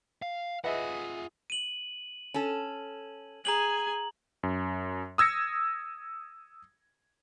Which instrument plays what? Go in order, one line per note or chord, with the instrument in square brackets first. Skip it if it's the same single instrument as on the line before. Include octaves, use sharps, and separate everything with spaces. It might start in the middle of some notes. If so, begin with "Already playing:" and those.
[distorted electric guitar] F5
[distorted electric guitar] F4 F#5 [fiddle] G#4 [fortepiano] B4 D#5 E5
[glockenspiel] D#7 F#7
[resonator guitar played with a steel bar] C#4 A4
[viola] G#4 G#5 [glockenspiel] A#5 F#7
[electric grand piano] F#2
D#6 E6 G#6 A#6 C#7